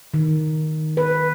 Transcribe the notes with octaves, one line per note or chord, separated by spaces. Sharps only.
D#3
B4